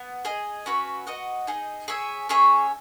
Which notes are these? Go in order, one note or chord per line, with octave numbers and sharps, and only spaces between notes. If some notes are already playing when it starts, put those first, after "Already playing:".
Already playing: B3
G#4 D#5 G#5
C#4 F#4 B4 E5
F#4 B4 D#5 F#5
D#4 G#4 D#5
G#4 C#5 E5 G#5
C#4 G#4 C#5 E5